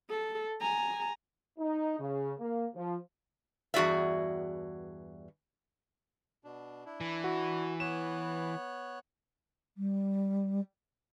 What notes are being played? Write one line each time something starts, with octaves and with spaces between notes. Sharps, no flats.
A4
G#5 A#5
D#4
C#3
A#3
F3
E2 G2 F#4 G#4 D5 E5
B2 D4
D4 E4
E3
F#4
B3 C#5 F#6 E7
G3